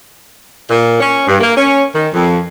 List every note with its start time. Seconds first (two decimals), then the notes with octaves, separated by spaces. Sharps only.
0.70 A#2
1.00 C#4
1.28 G2
1.40 A#3
1.57 C#4
1.95 D#3
2.13 F2